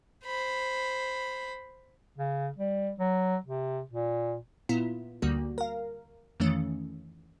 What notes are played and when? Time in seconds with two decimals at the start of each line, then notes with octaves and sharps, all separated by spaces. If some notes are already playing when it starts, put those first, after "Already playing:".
0.25 C5 B5
2.18 C#3
2.58 G3
3.00 F#3
3.46 C3
3.91 A#2
4.69 A#2 B3 E4 F4
5.22 D2 D3 G3 A#3 F#4
5.58 A#4 F5
6.40 F2 D#3 E3 A3 C#4